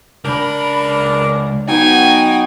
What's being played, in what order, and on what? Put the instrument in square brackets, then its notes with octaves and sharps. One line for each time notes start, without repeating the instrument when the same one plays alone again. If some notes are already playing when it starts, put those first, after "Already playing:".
[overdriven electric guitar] C#2 B5 [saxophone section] D4 A#4
[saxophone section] F#3 D#4 [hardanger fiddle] B3 G#5 [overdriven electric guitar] G5